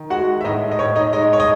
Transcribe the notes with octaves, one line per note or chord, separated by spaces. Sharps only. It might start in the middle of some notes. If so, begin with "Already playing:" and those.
Already playing: D#3
G#3 F#4 F#5
E5
A2 D#4 D#5
D#5
A2 C#5
D#4 D#5
G#3 D#4 D#5
C#5
D#5